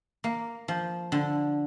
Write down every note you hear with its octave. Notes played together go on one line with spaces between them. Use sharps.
A#3
F3
D3